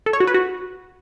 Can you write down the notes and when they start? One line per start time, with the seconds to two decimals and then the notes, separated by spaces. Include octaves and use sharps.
0.06 A4
0.13 C#5
0.20 F#4
0.27 B4
0.34 F#4